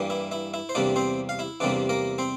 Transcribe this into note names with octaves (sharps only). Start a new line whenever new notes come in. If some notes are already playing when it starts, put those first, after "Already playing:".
Already playing: G2 E3 G3 A#3
E4 E5
E4 E5
E4 E5
C5
E2 C3 G3 A#3 D4 D5
C4 C5
F5
E4 E5
E2 C3 G3 A#3 D4 D5
A#3 A#4
C4 C5